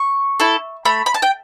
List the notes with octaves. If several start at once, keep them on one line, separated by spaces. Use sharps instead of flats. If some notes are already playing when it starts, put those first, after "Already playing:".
Already playing: C#6
E4 A4
A3 B5
B5
A5
G5